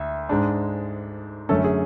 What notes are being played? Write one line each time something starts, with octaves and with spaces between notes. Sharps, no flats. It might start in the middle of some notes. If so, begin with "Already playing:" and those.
Already playing: D2 E5
G#2 G#3 D4
F#2 D3 A3 C#4 A4
G#4